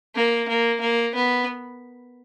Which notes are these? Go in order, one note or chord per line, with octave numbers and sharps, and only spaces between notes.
A#3
A#3
A#3
B3